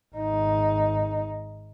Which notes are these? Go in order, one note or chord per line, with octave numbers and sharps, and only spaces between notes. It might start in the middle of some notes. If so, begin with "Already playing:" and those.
G#1 D#4